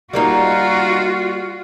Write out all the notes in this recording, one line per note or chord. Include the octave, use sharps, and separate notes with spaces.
G3 A#3 D#4 F4 F#4